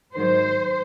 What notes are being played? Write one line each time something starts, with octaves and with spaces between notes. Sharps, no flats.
G#2 D#3 F#3 C5